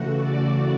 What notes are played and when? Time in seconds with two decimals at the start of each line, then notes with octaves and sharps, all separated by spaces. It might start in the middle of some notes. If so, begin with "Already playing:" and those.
Already playing: C#3 E3 A3 F#4
0.18 D5